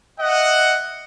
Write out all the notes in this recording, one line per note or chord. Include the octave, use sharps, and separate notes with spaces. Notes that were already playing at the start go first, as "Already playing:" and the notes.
D#5 E5 F#5